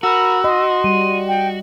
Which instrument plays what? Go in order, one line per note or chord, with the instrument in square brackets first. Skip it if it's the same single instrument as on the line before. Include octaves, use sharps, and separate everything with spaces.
[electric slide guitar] F#4 [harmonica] A#4 B5 [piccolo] E6
[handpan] D#5 [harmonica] C6
[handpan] G3 [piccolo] D#7
[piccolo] G5